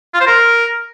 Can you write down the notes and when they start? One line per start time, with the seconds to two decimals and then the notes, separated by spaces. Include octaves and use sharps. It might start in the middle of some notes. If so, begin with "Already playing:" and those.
0.14 F4
0.20 C5
0.27 A#4